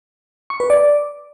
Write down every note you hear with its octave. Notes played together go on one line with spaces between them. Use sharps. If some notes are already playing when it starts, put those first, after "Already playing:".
C#6
B4
D5